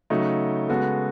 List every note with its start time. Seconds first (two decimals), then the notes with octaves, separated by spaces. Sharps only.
0.10 C#3 F#3 A3 D#4
0.69 C#3 G#3 B3 F#4 A4